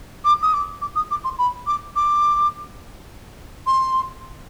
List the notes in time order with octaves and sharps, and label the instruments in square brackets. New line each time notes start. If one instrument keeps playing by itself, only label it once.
[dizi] D6
D#6
D6
D6
D#6
D6
C6
B5
D6
D6
C6